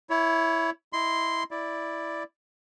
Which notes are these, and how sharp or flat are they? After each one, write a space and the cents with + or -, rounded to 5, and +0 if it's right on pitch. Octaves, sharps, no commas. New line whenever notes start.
E4 +0 C#5 +20
E4 -10 D#5 +0 C6 -10
E4 +0 D5 +0